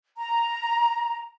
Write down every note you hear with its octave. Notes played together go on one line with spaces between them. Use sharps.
A#5